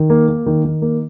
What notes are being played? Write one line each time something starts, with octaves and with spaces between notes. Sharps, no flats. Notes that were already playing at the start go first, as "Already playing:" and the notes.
Already playing: D#3
A#3
A#3
D#3
D#3
A#3